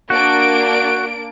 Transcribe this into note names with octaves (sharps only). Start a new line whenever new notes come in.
A#3 D4 F#4 D7